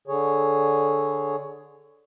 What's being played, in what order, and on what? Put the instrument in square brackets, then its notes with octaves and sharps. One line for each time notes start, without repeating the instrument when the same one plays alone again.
[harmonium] D3 G#4 C#5